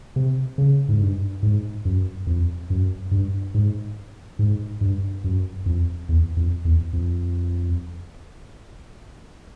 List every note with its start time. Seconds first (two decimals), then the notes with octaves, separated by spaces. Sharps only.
0.16 C3
0.58 C#3
0.89 G#2
1.00 G2
1.43 G#2
1.85 F#2
2.27 F2
2.70 F#2
3.11 G2
3.54 G#2
4.39 G#2
4.81 G2
5.24 F#2
5.66 F2
6.09 E2
6.37 F2
6.65 E2
6.93 F2